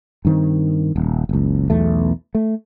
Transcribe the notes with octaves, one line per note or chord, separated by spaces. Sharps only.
G2 D#3 C4
D#1
F#1 C#2
B1 E2 A3
A3